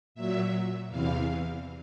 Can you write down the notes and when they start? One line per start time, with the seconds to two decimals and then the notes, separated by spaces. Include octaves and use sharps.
0.15 A#2 F#3 E5
0.89 E2 C3 E3 F5